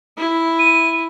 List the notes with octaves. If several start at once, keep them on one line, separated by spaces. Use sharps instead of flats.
E4
D#7